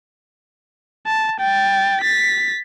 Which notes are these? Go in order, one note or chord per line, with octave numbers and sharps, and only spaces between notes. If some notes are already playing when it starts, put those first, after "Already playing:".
A5
G5 A6
A6 B6